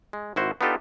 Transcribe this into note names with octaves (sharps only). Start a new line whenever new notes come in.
G#3
G#1 E4 F#4 C5
B3 D4 D#4 F4 G4 A4